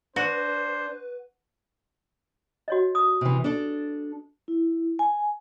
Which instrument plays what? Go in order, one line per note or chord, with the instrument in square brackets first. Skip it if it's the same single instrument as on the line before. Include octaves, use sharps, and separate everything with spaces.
[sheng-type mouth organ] D4 [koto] F#4 [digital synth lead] B4 [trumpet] C5
[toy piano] F#4 C#5 D#5
D#6
[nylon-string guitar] C3 E3
D4 A4
[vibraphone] E4
G#5